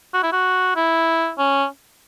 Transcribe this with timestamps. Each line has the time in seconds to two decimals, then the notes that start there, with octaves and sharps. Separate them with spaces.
0.14 F#4
0.23 E4
0.32 F#4
0.76 E4
1.38 C#4